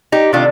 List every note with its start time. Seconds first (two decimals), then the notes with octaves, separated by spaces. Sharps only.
0.12 D#4 G4
0.33 C3 D#3 A3 D4 F4